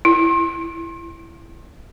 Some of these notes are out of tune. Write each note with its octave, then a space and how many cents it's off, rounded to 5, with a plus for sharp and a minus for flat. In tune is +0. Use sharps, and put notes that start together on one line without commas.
E4 +15